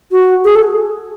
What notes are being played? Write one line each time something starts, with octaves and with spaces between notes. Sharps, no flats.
F#4
G#4
A4